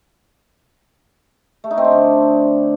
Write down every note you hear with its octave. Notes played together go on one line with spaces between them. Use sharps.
A3
D#4
C4
D4
D3